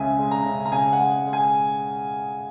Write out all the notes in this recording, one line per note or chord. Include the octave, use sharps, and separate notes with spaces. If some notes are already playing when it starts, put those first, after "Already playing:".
Already playing: C#2 C#3 G#3 C#4 E5 G#5
G#3
A#5
C#3
A#5
C#3 G#5
F#5
G#3
G#3
G#5